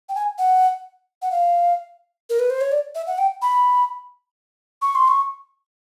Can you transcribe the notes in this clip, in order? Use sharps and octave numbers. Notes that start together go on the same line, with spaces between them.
G5
G#5
F#5
F#5
F5
A#4
B4
C5
C#5
D5
E5
F#5
G5
B5
C#6
C6
C#6